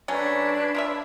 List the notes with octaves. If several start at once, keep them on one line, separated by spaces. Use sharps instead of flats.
F#3 A3 C#4 D4 B4 G#6
F4 A#4 E5